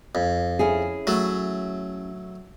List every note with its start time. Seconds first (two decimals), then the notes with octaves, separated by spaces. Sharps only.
0.15 F2
0.59 C#4 E4 G#4
1.07 F#3 A3